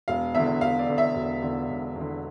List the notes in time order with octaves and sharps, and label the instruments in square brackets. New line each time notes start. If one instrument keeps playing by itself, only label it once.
[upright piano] E1 F5
E2 D3 E5
E1 F5
D5
E2 D3
E5
E1
E2 D3
E1
E2
D3